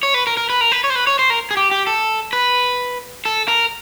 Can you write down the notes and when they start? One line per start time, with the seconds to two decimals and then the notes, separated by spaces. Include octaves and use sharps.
0.03 C#5
0.14 B4
0.27 A#4
0.37 A#4
0.50 B4
0.61 A#4
0.72 B4
0.84 C#5
0.90 C5
0.95 B4
1.07 C#5
1.19 C5
1.30 A#4
1.51 G#4
1.57 G4
1.71 G4
1.87 A4
2.33 B4
3.25 A4
3.48 A#4